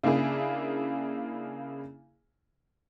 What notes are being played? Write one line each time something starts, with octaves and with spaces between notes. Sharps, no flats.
C#3 A#3 D4 E4 G#4